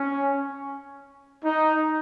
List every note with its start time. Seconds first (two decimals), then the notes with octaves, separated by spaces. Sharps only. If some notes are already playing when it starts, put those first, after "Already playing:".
Already playing: C#4
1.44 D#4